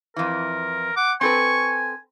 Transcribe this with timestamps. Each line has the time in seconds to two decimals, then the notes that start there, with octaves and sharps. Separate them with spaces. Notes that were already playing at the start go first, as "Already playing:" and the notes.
0.16 F2 E3 A#4
0.96 F#5 D6
1.21 C4 A4 B4 G#5 C#6